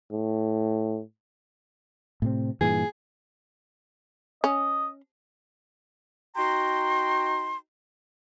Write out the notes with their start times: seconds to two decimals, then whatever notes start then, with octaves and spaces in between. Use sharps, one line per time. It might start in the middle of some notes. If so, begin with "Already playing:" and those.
0.12 A2
2.22 A2 C3 C4
2.61 G2 A#2 E3 G#4
4.44 C#4 D#5
6.36 D#4 F#4 G5 A#5 C6